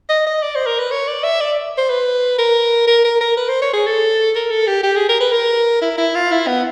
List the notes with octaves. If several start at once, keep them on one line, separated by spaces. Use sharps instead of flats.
D#5
D#5
D5
C5
A#4
B4
C#5
D5
E5
D5
C5
B4
A#4
A#4
A#4
A#4
B4
C5
C#5
G#4
A4
A#4
A4
G4
G4
G#4
A#4
B4
A#4
E4
E4
F4
E4
B3